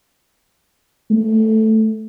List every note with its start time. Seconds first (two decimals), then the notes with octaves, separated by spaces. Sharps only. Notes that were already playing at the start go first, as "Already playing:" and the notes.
1.11 A3